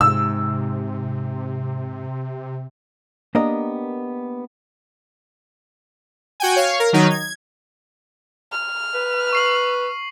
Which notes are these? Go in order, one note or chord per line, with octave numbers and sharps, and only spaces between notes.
G#2 C3 E6
A#3 B3 D4 G4 A#4 D#5
F#4 G5 G#5
C#5 F5
A#4
D#3 F#3 D#4
G#6
F6
B4
C#6 C7 F#7